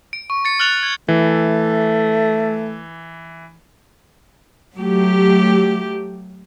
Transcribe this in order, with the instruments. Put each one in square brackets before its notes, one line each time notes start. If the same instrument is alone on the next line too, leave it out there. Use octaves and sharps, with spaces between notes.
[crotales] D7
C#6
A6 C#7
F6 F#6 A6 F7
G#6
[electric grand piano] E3 [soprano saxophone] A3
[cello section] F#3 A3 G4